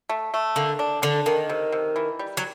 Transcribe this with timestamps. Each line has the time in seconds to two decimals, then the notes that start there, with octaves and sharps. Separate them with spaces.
0.09 A3
0.34 A3
0.56 D3 A#3
0.79 D4
1.02 D3 D4
1.26 D#3 A#3
1.49 C3
1.72 C3
1.96 E3
2.19 G3
2.37 F#3